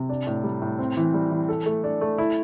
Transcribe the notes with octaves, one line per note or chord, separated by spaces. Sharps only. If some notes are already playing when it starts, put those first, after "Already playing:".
Already playing: C3
D4
A2
G3
A2
C4
E3
G3
E3
A4
A3
D4
A3
E4